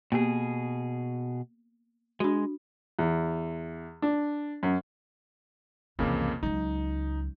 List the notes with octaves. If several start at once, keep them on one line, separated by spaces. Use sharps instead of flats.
B2 A#3 B3 G4 G#4
G#3 D4 F#4
E2
D4
F#2
C2 F2 C#3 E3 A#3
C#2 F#3 D#4